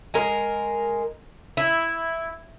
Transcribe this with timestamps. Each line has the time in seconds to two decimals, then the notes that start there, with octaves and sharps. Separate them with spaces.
0.14 G#3 A#4
1.57 E4